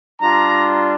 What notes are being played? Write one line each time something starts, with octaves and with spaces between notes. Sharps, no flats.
G3 D4 F4 A#5